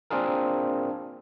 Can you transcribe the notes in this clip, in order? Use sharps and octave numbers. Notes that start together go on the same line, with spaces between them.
A#3 C4 D4 F4 G#4 A#4